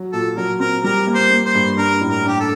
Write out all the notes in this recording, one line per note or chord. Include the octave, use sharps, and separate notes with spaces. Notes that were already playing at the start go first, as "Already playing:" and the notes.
Already playing: F#3
A#2 A4
F#3 A#4
C4 A#4
G3 A#4
A#3
C5
A#3
C5
G2
D4 A#4
A2
A#4
D4 G4
A4